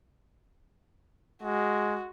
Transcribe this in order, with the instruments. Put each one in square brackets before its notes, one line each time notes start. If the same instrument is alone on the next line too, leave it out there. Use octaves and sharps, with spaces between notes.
[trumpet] G#3 [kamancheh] F#4